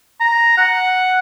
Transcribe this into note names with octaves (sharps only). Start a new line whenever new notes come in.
A#5
F#5